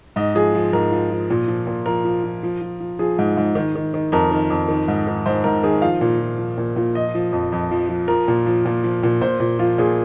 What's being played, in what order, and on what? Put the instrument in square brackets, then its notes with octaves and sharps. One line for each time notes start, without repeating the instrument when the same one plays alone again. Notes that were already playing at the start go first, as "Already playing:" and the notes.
[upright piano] G#2 D#5
F3 G#4
F3
G#2 A#4
F3
F3
A#2
F3
A#2
F3 A#4
F3
F3
F3
F3
F3
F3 G#4
G#2
G#2
D#3
D#3
D#3
F2 A#4
D#3
F2
D#3
G#2
D#3
G#2 C5
G#2 A#4
D#3 G#4
F3 F5
A#2
F3
F3
A#2
A#2
F3 D#5
F3
F2
F2
F3
F3
F3 A#4
A#2
F3
A#2
F3
A#2
A#2 C5
A#2
F3 F4
A#2 G#4